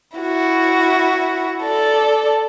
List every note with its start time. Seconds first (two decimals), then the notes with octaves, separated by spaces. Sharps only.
0.17 E4 F#4
1.63 A4 D5